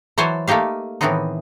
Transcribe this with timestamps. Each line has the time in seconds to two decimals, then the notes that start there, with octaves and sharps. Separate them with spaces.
0.18 E3 F#3 C5 C#5 G#5 A5
0.48 A3 A#3 D#4 G4 F5
1.01 A2 D#3 E3 B3 C4 D#4